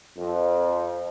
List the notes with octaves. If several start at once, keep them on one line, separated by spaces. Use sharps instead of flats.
F2